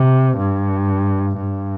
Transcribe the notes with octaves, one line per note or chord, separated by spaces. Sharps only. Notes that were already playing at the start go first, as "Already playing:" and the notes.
Already playing: C3
G2
G2